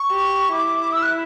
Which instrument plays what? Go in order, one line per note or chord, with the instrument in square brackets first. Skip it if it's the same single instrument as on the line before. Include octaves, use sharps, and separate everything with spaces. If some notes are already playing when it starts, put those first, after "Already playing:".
Already playing: [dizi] C#6
[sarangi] G4
[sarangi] E4 [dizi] D6
[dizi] E6
F#6